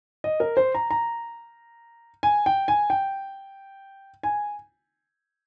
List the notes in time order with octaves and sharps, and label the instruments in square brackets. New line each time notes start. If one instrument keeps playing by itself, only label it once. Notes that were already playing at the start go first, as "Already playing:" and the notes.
[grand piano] D#5
A#4
C5
A#5
A#5
G#5
G5
G#5
G5
G#5